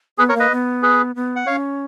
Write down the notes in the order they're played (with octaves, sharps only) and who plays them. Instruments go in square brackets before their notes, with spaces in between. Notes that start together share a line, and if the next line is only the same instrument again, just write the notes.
[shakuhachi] B3 [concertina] G#4 B4
[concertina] A#4 C#5
[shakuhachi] A#3
[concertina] B4 D#5
[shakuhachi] B3
[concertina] G#4 B4
[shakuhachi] B3
[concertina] F#5
[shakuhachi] C#4 [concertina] C#5 F5